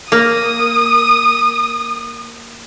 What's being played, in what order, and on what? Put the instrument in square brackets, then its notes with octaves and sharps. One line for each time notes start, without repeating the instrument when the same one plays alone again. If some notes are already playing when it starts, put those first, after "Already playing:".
[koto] A#3 [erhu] D#6